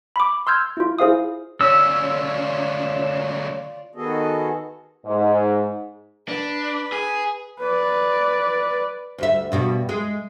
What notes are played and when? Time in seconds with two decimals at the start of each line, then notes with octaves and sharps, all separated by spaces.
0.16 B5 D6
0.47 C6 E6 F6 G6 G#6
0.77 E4 F4
0.99 E4 G#4 C5 F5 D#6
1.61 D2 C#4 F4 C#5 D5 E6
3.95 D#3 B3 F#4 G#4 A4 D#5
5.06 G#2
6.28 D4 B4
6.92 G#4
7.60 B4 D5
9.18 D2 G3 E5
9.52 G2 B2 G3
9.89 G#3